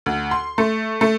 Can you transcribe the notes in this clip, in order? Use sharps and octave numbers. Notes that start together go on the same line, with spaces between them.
D2
C6
A3
A3